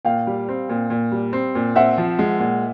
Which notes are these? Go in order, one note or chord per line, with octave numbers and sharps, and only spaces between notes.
A#2 F5 G5
G3
C4
A#2
A#2
G3
C4
A#2
C4 E5 F#5
F3
G#3
A#2